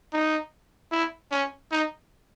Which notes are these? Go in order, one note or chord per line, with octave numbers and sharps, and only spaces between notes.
D#4
E4
C#4
D#4